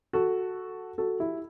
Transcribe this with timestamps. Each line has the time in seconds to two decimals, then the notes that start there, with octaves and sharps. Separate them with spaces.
0.13 F#4 A4
0.98 F#4 A4
1.19 E4 G4